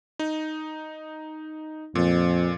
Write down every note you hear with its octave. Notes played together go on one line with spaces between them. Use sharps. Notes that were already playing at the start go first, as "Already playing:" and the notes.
D#4
F2 A#2